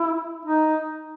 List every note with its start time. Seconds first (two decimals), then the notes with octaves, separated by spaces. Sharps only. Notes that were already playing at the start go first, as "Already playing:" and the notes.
Already playing: E4
0.45 D#4